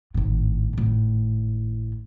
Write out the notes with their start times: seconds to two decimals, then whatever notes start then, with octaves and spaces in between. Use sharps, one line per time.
0.14 G#1 A2
0.73 G#1 A2